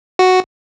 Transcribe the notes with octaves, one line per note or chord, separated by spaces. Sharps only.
F#4